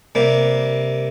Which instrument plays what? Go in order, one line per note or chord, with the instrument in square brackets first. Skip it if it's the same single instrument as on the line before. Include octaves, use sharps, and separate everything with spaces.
[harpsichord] C3 G3 A#3